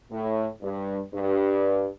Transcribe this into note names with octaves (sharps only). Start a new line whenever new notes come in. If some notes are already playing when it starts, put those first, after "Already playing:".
A2
G2
G2